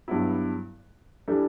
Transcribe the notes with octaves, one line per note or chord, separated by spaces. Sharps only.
G2 F#3 B3 E4
E3 G3 D4 A4